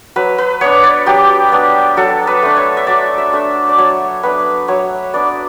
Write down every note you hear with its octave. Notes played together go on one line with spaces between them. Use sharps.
F#3 B4
B4
B3 D4 C#5
D5
F#3 G4
B3 D4
F#3 A4
B4
A3 D4
C#5
E5
F#3 D5
E5
A3 D4
D5
F#3 C#5
B3 D4 B4
F#3 C#5
B3 D4 D5